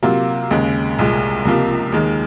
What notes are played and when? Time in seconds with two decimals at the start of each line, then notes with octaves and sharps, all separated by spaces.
0.03 C3 F#3 A#3 F4
0.51 D#2 C#3 G#3
0.99 C2 A#2 G#3
1.45 C#2 C3 F3 A#3
1.92 D#2 D#3 G#3